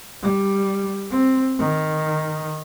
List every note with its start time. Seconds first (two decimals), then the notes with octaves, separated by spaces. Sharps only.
0.23 G3
1.11 C4
1.59 D#3